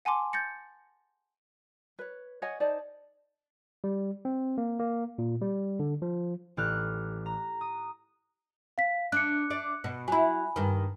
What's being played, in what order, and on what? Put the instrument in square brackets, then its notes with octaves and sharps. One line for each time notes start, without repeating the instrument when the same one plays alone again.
[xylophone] F#5 G#5 A5 C6 D6
G6 A6 A#6 C#7
[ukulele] B4 C#5
C#5 D#5 F#5 G#5
D#4 C5 D5 A5
[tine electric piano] G3
C4
A#3
A#3
A#2
G3
D3
F3
[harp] A1 G4 F6 F#6
A#5
D#6
[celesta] F5 B6
[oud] D4 [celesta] F#6 C#7
[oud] D4 D5
B2
[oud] F#3 E4 [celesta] G#5 B5
[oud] G2 D#3